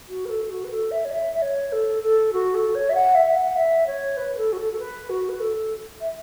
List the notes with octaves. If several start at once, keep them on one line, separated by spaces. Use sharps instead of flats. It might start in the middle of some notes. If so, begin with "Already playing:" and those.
F#4
B4
A4
F#4
B4
A4
E5
C#5
E5
E5
C#5
A4
A4
F#4
A4
C#5
E5
F#5
E5
F#5
E5
C#5
B4
A4
F#4
A4
A4
B4
F#4
B4
A4
E5